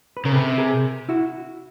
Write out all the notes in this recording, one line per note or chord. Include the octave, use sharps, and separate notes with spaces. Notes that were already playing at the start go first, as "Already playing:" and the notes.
B4
C#3 A#4
C3 A4 B4
G#4 A#4
E4 F#4